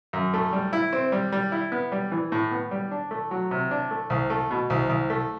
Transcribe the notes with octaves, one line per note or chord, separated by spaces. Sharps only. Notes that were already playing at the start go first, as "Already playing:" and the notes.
F#2
A3
G3
E4
C4
G3
G3
E4
B3
G3
E3
A2
B3
G3
D4
A3
F#3
C3
D4
A3
C2
A3
B2
C2
C2
A3